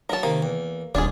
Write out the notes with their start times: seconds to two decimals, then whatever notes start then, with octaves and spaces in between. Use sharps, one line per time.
0.09 F#3 A#3 A5 A#5
0.23 C3 D#3 A#3
0.42 E2
0.95 D#1 D4 F4 G#4 G#5